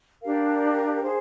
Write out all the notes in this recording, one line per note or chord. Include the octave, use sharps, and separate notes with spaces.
D4 G4 A#4 F5
G#4 C5